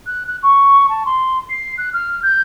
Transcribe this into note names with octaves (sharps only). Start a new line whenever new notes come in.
F#6
F#6
C#6
A5
C6
C7
F#6
F6
G6